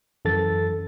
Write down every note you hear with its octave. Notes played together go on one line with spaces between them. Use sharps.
F#2 E3 A4 A6